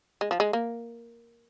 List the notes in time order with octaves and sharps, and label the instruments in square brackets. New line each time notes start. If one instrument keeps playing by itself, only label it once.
[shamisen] G#3
F3
G#3
A#3